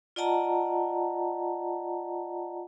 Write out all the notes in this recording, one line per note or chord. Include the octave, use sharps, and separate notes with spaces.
F4 D5 D#5 F#5 A5 A#5